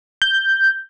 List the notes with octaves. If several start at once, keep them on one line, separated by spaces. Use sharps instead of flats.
G6